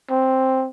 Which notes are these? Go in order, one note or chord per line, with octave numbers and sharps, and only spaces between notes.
C4